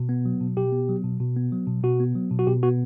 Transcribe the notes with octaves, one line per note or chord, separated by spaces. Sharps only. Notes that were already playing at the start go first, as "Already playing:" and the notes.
Already playing: B2
B3
F#3
B2
B2 G4
B3
F#3
B2
B2
B3
F#3
B2
B2 F#4
B3
F#3
B2
F#4
B2 G4
B3 F#4